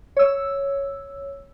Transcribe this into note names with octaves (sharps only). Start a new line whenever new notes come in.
C#5 E6